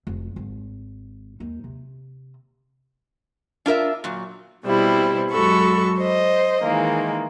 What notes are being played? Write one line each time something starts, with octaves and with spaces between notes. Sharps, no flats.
F1
G#1
D#2 D#4
C3
D4 F4 A#4 E5
A#2 F#3
B2 G3 C4 E4
F#2 G#3 F#4 A4 B5 C#6
C5 D#5
D#3 E3 G#3 A#3